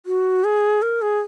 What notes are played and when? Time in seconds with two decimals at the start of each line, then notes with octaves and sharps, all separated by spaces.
0.06 F#4
0.44 G#4
0.82 A#4
1.02 G#4